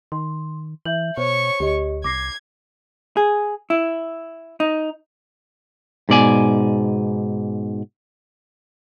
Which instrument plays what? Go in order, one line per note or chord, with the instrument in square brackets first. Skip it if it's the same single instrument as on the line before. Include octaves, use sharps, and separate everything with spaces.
[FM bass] D#3 [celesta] C6
[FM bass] E3 [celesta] E5 G6 F#7
[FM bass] B2 [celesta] C5 [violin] C#5 C#6
[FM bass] D2 [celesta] G4 D#5
[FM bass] C2 [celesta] D6 A#6 C7 [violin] G#6
[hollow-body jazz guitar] G#4
E4
D#4
[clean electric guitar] G#2 B2 D5 G#5